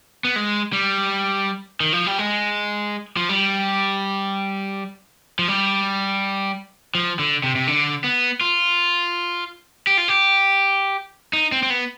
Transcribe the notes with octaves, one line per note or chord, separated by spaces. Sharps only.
B3
G#3
G3
D#3
F3
G3
G#3
F3
G3
F3
G3
F3
D3
C3
C3
D3
B3
F4
G4
F4
G4
D#4
C4
C4
B3